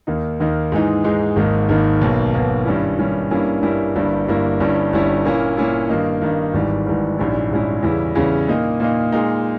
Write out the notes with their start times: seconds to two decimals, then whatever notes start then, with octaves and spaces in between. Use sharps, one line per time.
0.07 D#2 D#3 A#3 D#4
0.40 D#2 D#3 A#3 D#4
0.72 G#2 E3 G#3 D#4
1.04 G#2 E3 G#3 D#4
1.36 G#1 G#2 D#3 A#3 D#4
1.69 G#1 G#2 D#3 A#3 D#4
2.01 B1 B2 A#3
2.33 B1 B2 A#3
2.65 G2 D#3 G3 C#4 E4
2.99 G2 D#3 G3 C#4 E4
3.31 G2 G3 A#3 C#4 E4
3.62 G2 G3 A#3 C#4 E4
3.95 G1 G2 G3 A#3 E4
4.28 G1 G2 G3 A#3 E4
4.60 G1 G2 G3 C#4 E4
4.92 G1 G2 G3 C#4 E4
5.25 A#2 A#3 C#4 E4
5.57 A#2 A#3 C#4 E4
5.89 G2 D#3 A#3 D#4
6.21 G2 D#3 A#3 D#4
6.53 G#1 G#2 E3 G3
6.86 G#1 G#2 E3 G3
7.18 A#1 G#2 G3 C#4 E4
7.51 A#1 G#2 G3 C#4 E4
7.83 E2 C#3 G3 C#4 E4
8.15 E2 C#3 G3 C#4 E4
8.48 A#2 A#3 D#4
8.80 A#2 A#3 D#4
9.12 A#2 G#3 D#4